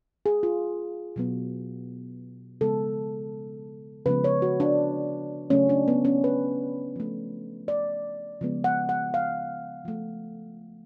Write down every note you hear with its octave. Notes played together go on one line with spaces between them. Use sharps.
G#4
F4
B2 F#3 B3
C#3 F3 G#3 B3 A4
C#3 F3 G#3 B3 B4
C#5
F#4
D4
C#3 F#3 A3 C#4
D4
B3
C#4
B4
F3 A3
D5
C#3 F3 G#3 B3
F#5
F#5
F5
F3 A3